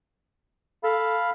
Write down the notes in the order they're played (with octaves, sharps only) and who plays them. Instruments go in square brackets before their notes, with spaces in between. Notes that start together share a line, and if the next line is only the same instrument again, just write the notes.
[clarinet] A4 [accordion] F5 B5